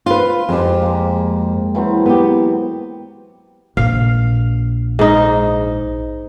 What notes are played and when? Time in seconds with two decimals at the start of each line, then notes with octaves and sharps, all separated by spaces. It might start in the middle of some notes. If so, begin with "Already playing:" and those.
0.06 F4 B4
0.49 F2 G#3 G4
0.82 G#3 A#3
1.75 E3 F#3 C4
2.06 B3 G4
3.77 A#1 F5
4.99 G#2 D#4